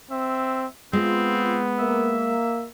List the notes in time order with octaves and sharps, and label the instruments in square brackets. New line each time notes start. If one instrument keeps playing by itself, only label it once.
[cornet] C4 [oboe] E5
[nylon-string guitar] G#3 [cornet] B3 [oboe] C4 [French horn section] F4
[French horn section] A#3 [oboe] E5